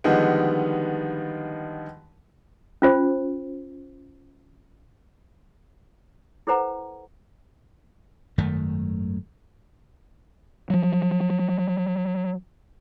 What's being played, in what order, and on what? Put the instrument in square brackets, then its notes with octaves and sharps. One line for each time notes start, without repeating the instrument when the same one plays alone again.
[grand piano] D3 D#3 F3 G3 G#3 B3
[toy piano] C#4 F4 C5
E4 A4 B4 C5 F#5 A#5
[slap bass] G#1 F#2 D#3 A3
[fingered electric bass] F3 F#3